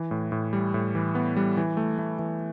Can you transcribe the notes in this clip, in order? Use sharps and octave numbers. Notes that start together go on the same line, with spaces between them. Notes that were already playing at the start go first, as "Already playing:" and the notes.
Already playing: E3
A2
A2
G3
A2
E3
B3
G3
E3
A3
A3
E3